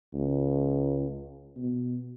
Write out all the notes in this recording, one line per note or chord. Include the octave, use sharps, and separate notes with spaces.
C#2
B2